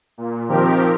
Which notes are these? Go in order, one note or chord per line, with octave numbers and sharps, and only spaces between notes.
A#2
D#3 F3 C4 G4 A#4